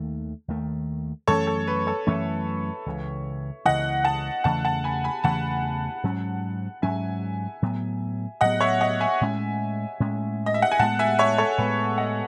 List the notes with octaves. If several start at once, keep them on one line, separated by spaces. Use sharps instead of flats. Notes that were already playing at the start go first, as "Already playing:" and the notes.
Already playing: D#2 D#3 A3
D#2 D#3 A3
F#2 E3 A3 C#4 A4 C#5
A4
B4
A4 C#5
F#2 E3 A3 C#4 C#5 E5
C#2 C#3 E3
C#2 C#3 E3 D#5 F#5
F#5 A5
E2 C#3 E3 A3 F#5 A5
F#5 A5
G#5 B5
G#5 B5
E2 C#3 E3 A3 F#5 A5
G#2 F#3 C#4
G#2 F#3 C#4 E5 G#5
A2 F#3 B3
A2 F#3 B3 D#5 F#5
C#5 E5
D#5 F#5
E5 G#5
A2 G#3 C#4
A2 G#3 C#4
D#5
E5
F#5
G#5
A2 G#3 B3 F#5 A5
E5 G#5
C#5 E5
A4 C#5
A2 G#3 B3 B4
D#5 F#5